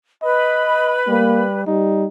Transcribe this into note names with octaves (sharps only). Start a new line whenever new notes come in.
B4 D#5 B5
G3 A#3
G3 D#4